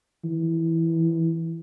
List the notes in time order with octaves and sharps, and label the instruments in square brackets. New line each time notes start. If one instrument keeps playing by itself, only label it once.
[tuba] E3